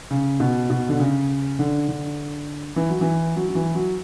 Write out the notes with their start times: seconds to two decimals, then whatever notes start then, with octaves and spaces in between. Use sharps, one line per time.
0.11 C#3
0.40 B2
0.70 B2
0.89 D3
1.00 C#3
1.59 D3
1.89 D3
2.76 E3
2.89 F#3
3.01 E3
3.36 F#3
3.49 F#3
3.55 E3
3.75 F#3